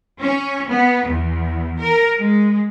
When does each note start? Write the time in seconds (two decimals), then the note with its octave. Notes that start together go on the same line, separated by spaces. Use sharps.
0.19 C#4
0.68 B3
1.06 E2
1.80 A#4
2.17 G#3